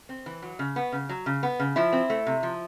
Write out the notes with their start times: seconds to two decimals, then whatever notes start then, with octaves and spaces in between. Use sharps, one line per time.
0.09 C4
0.26 E3
0.42 F#3
0.59 C#3
0.76 B3
0.92 C#3
1.09 F#3
1.26 C#3
1.43 B3
1.60 C#3
1.76 F3 E4
1.93 C4
2.10 A3
2.27 C3
2.43 F3